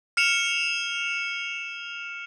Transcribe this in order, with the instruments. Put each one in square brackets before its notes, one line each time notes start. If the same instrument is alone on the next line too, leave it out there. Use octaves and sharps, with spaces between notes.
[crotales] F6 C#7 E7 F7